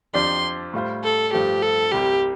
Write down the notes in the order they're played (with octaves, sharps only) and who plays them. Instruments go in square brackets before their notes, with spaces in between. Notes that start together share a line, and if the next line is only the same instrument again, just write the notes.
[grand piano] F2 F3 D4 G4 D5 [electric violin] C6
[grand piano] A2 G3 F4 C5
[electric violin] A4
[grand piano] G2 F3 A3 [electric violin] G4
[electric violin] A4
[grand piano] C2 C3 G3 [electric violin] G4